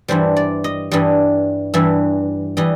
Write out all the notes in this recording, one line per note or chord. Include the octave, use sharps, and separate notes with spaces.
G2 E3 G3 C5
D5
D#5
G2 E3 G3 D#5
G2 E3 G3 E5
E3 G3 D#5